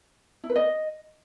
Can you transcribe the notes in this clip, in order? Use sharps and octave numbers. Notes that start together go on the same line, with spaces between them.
E4
B4
D#5